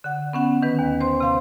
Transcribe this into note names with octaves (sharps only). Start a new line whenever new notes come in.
D3 F#5
B3 C#4 F#5
D#3 B4
D#2
C5 C6
C3 F5 C6